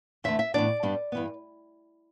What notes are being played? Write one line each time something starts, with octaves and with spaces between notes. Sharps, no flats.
E2 D3 A3 E5
E5
A2 E3 B3 D4 D5
G2 G3 B3 D4
G2 E3 B3